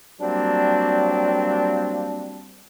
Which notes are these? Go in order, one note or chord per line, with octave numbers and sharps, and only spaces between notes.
F#3 G3 A#3 C4 D4